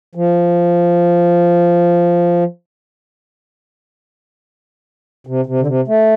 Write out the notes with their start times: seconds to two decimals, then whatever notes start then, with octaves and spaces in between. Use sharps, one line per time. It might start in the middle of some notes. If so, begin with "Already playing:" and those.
0.15 F3
5.27 C3
5.46 C3
5.60 D3
5.67 C3
5.88 A3